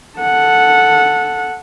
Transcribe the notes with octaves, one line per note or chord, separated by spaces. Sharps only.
A4 F#5